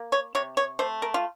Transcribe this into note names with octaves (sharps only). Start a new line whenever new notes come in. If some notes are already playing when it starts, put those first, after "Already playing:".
Already playing: A#3
C#5
C3 C#5
C#5
A3 C5
A#4
F4